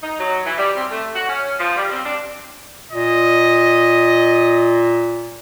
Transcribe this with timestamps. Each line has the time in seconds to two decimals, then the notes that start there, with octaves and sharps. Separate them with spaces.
0.02 D#4
0.19 F#3
0.45 E3
0.57 G3
0.76 C4
0.91 A3
1.14 F#4
1.28 C#4
1.59 F3
1.75 G3
1.91 C4
2.04 D4
2.92 A#2 D#5